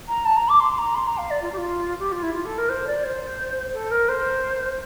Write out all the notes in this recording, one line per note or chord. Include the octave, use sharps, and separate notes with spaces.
A#5
A5
A#5
D6
C6
A#5
C6
A#5
F5
D5
F4
G4
F4
G4
F4
E4
F4
A4
A#4
C5
D5
C5
A4
A#4
C5